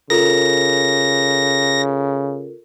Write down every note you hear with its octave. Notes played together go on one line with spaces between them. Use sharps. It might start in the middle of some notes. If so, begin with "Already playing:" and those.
C#3 F4 A4 A#4 A#6